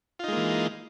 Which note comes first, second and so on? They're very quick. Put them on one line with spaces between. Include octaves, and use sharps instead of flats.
F4 D#4 G#3 A#3 E3